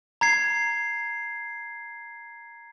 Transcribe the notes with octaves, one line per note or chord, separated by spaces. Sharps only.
A#5 G#6 C7